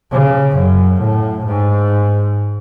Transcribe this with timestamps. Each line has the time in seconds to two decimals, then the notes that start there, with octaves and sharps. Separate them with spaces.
0.12 C#3
0.57 F#2
1.01 A2
1.46 G#2